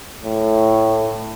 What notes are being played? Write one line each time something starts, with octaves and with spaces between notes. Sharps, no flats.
A2